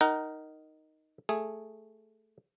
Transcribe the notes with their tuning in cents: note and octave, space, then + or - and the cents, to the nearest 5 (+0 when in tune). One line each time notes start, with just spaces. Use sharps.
D#4 +0 A#4 +0 F#5 +40
A3 +0 G#4 +0